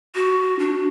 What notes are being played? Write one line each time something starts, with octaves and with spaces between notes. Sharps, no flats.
F#4
D4